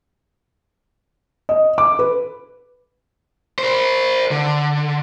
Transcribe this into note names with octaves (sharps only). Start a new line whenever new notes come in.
D#5
D6
B4
A#4 C5
D3